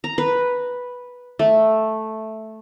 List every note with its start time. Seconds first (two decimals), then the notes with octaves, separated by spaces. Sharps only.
0.04 A#5
0.18 B4
1.39 A3